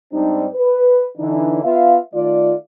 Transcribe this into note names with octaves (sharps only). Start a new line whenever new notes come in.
G#2 G3 C4 D4 D#4
B4
D3 E3 D4 D#4
B3 F4 E5 F5
D#3 A3 F4 D5